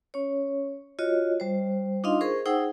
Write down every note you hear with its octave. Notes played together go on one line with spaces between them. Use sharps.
C#4 C#5
F4 F#4 C#5 D#5
G3 C5
D4 D#4 F4 D#5 F5 C6
G#4 A#4 C5 C#6
D#4 G#4 C5 F#5 G5 E6